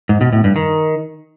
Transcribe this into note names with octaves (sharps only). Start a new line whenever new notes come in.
G#2
B2
A2
G2
D#3